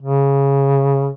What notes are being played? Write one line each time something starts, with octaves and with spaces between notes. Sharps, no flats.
C#3